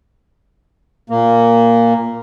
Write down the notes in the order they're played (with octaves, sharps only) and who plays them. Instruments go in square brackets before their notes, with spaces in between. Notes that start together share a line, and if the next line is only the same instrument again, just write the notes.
[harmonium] A#2 A#3